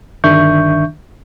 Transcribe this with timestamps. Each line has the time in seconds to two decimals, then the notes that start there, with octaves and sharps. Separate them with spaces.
0.24 G1 D#3 D4 E5 C#6 G6